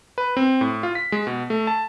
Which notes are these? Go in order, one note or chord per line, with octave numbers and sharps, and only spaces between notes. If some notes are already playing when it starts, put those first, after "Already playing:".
B4
C4
A2
F4
B6
G#3
B2
A3
A5